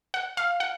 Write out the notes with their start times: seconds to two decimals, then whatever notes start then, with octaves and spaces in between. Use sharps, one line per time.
0.14 F#5
0.37 F5
0.60 F#5